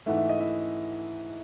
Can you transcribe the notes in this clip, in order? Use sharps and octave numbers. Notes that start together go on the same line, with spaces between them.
G#2 E3 A3 F#5
E5
D#5
E4 E5